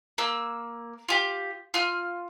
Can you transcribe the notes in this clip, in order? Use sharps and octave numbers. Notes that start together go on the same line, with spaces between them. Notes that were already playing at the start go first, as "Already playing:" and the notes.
A#3 E6
F4 G4
F4 F6